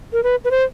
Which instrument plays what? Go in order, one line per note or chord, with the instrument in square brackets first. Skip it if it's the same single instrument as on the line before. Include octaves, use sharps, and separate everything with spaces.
[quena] A#4
B4
B4
C5